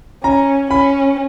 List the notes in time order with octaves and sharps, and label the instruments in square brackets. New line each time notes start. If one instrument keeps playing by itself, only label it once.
[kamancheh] C#4 [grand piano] A#5
[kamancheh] C#4 [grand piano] B5